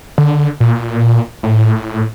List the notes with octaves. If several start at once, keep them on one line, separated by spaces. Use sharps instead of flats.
D3
A#2
A2